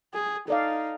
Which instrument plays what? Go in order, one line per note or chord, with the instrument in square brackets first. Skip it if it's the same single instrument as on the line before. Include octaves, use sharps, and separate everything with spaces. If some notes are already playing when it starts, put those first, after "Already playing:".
[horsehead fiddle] G#4
[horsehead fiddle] D#4 [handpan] A4 D5 F5